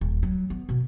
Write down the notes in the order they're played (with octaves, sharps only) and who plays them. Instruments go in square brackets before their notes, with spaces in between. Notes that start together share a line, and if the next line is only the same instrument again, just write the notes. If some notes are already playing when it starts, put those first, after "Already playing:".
[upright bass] D#1
F#3
B3
B2